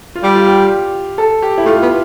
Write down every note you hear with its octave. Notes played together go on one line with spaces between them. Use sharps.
F4
G3 G4
F4
G4
A4
G4
E4
A3 F4
B3